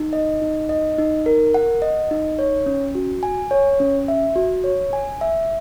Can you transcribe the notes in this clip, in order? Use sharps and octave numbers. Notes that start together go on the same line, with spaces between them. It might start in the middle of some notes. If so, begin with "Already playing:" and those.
Already playing: D#4
D#5
D#4
D#5
D#4
A#4
F#5
D#5
D#4
C#5
C#4
F#4
G#5
C#5
C#4
E5
F#4
C#5
G#5
E5